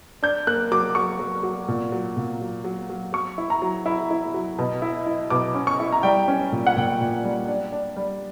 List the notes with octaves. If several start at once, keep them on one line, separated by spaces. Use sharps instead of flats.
D4 G6
A#3 F#6
F#3 D6
F#3 C#6
F#3
F#3
A#2
F#3
A#2
F#3
F#3
F#3
F#3 C#6
E4
A#5
F#3
E4 B5
E4
F#3
B2
E4
E4
B2 D6
C#4
C#6
E4
A#5
G3 G5
C#4
A#2
F#5
A#2 G5
A#2
G3
D4
D4
G3